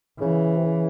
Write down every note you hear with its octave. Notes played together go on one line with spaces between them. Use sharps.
C#3 E3
C3
C#3